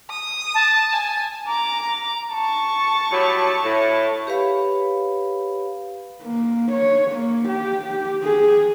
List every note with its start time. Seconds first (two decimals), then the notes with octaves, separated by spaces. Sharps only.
0.10 D#6
0.54 A5
0.93 G#5
1.47 A#5 D6
2.33 A5 C#6
3.12 A2 F#3 G3
3.65 A2
4.27 G4 B4 C#5 F5 B5
6.23 A#3
6.72 C#5
7.11 A#3
7.48 G4
7.84 G4
8.24 G#4